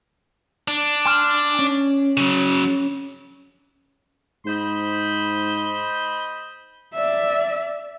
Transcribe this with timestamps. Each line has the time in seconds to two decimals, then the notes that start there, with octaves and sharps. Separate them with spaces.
0.68 D4
1.06 G#5 C6 F6
1.59 C#4
2.17 C#3 F#3
4.45 G#2 C5 D#5 B5
6.95 D5 E5